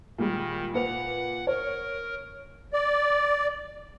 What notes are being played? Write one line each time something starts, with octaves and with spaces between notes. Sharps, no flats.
A#2 D#3 G3 G#3
A#2 B4 F#5 F7
A#4 C#5
D5